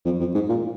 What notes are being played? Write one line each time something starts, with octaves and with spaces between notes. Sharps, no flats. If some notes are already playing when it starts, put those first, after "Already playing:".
F2
F2
G#2
A#2